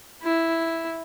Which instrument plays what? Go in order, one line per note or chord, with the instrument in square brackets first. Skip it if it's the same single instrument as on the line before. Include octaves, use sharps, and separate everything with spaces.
[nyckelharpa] E4